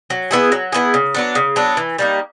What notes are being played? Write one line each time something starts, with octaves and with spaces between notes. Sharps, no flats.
F#3
B3 E4 G#4
F#3
B3 E4 G#4
C#3
F#3 B3 D4
C#3
F#3 B3 D4
E3
G3 A#3 D#4